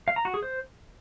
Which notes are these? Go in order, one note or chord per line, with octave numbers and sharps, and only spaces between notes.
F5
A#5
F#4
G#4
C5